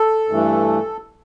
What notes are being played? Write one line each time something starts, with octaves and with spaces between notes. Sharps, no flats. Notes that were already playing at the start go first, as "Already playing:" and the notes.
Already playing: A4
G2 E3 A3